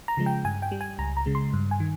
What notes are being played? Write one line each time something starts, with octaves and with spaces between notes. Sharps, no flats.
A#5
C#3 F3 G#3
G5
G2 G#5
G5
G3
G#5
C#2 A#5
A#5
C#3 G#3
C6
G2
G#5
D#3